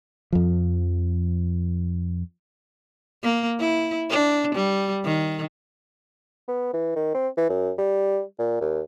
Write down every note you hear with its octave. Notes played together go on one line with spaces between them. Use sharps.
F2 F3
A#3
E4
D4
G3
D#3
B3
E3
D#3
C4
E3
F#2
G3
A#2
D#2